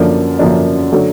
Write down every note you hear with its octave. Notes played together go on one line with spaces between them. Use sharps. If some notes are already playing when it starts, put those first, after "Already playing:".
Already playing: F#2 D3 F3 A#3 D4
F#2 D3 F3 A#3 D4
D3 F#3 A3